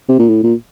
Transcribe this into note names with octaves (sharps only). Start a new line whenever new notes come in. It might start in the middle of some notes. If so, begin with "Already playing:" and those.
C3
A#2
A2
A#2